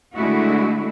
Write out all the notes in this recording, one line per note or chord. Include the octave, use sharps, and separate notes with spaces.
D3 G#3 A3 E4 F#4